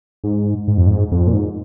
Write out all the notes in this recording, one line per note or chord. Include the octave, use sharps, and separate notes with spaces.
G#2
G#2
F2
G#2
F2
A#2
G#2